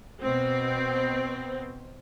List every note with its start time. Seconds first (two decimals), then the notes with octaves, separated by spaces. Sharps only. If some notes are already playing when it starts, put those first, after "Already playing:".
0.22 B2 C4